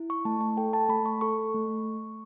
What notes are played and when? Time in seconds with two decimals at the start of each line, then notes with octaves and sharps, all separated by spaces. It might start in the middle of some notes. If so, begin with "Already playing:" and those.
Already playing: E4
0.10 C#6
0.25 A3 A5
0.41 A5
0.57 A4 G5
0.73 A5
0.89 A3 B5
1.06 C#6
1.21 A4 C#6
1.54 A3